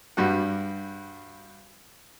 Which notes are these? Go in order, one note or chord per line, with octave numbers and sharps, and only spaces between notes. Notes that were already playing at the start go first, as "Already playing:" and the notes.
G2 G3 F#4 F#5